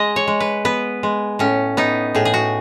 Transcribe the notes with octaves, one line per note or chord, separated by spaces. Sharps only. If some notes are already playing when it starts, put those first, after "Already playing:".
Already playing: G#3 D#5
C#5
G#3
B4
B3 B4
G#3
A2 C#4
B3 D#4
A2 G#4
G#4
F#4